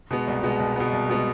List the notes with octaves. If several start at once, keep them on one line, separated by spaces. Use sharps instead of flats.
B2 G#3 B3
C2
B2 G#3 B3
C2
B2 G#3 B3
C2
B2 G#3 B3